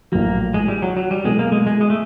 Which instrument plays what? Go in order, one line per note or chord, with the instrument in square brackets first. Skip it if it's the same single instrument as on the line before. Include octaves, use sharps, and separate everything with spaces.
[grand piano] A#1 A2 F#3 [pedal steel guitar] A#3
[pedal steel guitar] G#3
G3
F#3
F#3
G3
[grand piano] B2 F#3 B3 E4 A4 [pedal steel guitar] G#3
[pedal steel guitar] A#3
G#3
G#3
G#3
A3